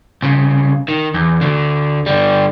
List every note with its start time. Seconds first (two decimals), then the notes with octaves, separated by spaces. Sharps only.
0.23 C2 C#3
0.88 D#3
1.14 E2
1.41 D2 D3
2.06 D3 G3